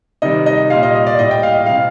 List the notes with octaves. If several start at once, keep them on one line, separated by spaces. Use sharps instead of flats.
C3 D#3 G3 D#5
D#5
A#2 G3 F5
D#5
D#5
D5
A2 G3 D#5
G5
F5
D#5
C3 G3 F5